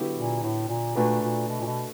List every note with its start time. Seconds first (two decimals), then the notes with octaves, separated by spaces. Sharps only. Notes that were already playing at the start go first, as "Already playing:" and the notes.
Already playing: D3 F#3 B3 E4 G4
0.16 A#2
0.43 A2
0.68 A#2
0.95 A#2 A3 D4 F#4 B4
1.22 A#2
1.48 B2
1.61 A#2
1.66 B2